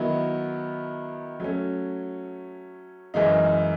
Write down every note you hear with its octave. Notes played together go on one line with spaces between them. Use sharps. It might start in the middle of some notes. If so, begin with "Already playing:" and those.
Already playing: D#3 F#3 B3 E4
F#3 A3 C#4
F#2 E3 G#3 D#4